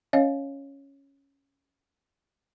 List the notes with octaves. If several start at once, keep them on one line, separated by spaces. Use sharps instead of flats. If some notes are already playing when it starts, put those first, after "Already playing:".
C#4 C#5 D#5 F5